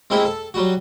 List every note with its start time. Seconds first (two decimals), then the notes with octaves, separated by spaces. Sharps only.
0.10 G#3 A#3 C4 E4 G4
0.25 A4
0.54 F#3 G3 F#4